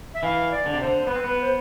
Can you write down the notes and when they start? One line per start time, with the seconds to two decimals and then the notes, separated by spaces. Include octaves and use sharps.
0.14 E5
0.23 E3 F5
0.51 D5
0.66 D3
0.70 C3 D5
0.80 D3 C5
1.07 B3 B4
1.16 C4
1.24 B3 B4
1.41 C5